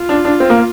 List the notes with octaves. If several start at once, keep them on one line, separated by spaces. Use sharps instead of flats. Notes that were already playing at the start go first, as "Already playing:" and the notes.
Already playing: F4
D4
D4
C4
A#3